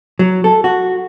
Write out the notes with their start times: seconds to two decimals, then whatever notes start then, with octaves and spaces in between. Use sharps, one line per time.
0.19 F#3
0.44 A4
0.64 F#4